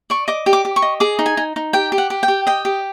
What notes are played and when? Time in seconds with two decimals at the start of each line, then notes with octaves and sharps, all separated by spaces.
0.10 D5 C#6
0.28 D#5 D6
0.46 G4
0.53 D6
0.65 G4
0.76 C#6
0.82 D#5
1.00 G#4 D6
1.19 D#4
1.26 G#5
1.37 D#4
1.56 D#4
1.73 G4 G5
1.92 G4
1.98 F#5
2.10 G4
2.23 G5
2.28 G4
2.47 D#5 G5
2.65 G4